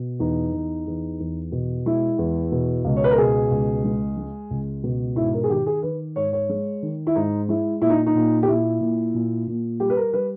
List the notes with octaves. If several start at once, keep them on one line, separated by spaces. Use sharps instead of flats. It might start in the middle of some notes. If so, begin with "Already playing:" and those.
Already playing: B2
E2 D#4
E2
E2
E2
B2
G#3 E4
E2
B2
C#2
C#5
B4
A#4
B2 G#4
C#2
G#3
G#3
C#2
B2
G#2 E4
A#4
G#4
D#3 G4
G#4
D#3 B4
G#2 C#5
C#5
G#3
D#3
E4
G#2 D#4
G#3 E4
A#2 E4
D#4
D#4
A#2
G4
A#2 E4
A#2
A#2
A#2
G3 G4
B4
A#4
G3 B4